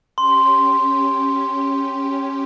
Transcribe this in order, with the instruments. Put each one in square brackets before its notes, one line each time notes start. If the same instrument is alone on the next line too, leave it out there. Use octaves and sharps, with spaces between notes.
[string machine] C#4 G4 [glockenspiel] C6